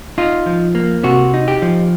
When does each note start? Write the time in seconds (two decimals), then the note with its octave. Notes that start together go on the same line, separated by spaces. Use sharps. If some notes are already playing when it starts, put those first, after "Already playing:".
0.18 D#4 F4
0.46 F3
0.75 A#3
1.04 C3 F#4
1.34 D#4
1.48 G4
1.62 F3